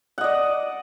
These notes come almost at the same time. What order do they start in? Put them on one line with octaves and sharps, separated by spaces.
F#5 D#5 D5